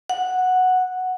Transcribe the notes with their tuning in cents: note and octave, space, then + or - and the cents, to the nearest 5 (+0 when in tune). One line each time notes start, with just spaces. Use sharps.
F#5 -5